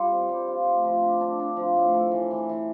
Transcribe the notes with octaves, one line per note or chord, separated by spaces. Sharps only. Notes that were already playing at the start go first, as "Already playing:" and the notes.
Already playing: G3 F4
C4
G3
F4
A3
F3
D4
D4
D4
F3
A2
A3
E3
E3
E3